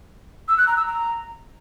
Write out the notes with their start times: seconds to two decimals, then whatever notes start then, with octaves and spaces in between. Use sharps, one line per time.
0.48 E6
0.58 F#6
0.67 A#5
0.77 E6
0.86 A#5